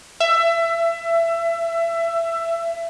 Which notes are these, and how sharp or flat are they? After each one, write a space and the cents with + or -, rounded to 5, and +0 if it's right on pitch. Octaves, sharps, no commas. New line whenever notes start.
E5 +25